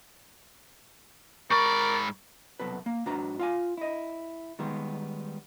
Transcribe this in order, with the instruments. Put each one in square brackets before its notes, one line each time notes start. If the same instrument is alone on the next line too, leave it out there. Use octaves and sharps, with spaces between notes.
[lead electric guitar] G#2 B5 [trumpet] A#4 [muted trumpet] D5 [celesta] C#6
[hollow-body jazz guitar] C2 F#2 B2 A4 B4
A#3
G#2 D4 F#4 B4 A#5
F4 F5 G#5
E4 D#5
D#3 G3 G#3 B3